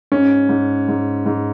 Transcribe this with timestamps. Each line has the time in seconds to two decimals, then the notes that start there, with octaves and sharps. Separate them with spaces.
0.12 G#2 C#4
0.49 G#2
0.88 G#2
1.26 G#2